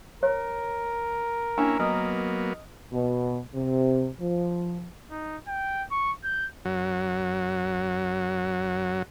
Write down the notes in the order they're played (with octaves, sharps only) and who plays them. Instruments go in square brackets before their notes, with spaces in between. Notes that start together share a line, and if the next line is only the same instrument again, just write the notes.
[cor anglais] A#4 [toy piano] C#5
[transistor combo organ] A#3 C#4 E4 [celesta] D4 [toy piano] G#5
[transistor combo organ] F#3 A#3 B3 [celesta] D#5 D#6 F6
[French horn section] B2
C3
F3
[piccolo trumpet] D#4
G5
C#6
G6
[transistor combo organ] F#2 F#3